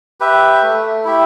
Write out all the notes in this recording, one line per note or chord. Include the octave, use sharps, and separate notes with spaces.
G4 B4 E5
A3
E4 G4 E5